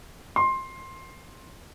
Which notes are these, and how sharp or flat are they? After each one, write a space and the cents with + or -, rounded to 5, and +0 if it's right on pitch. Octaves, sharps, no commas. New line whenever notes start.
C6 +15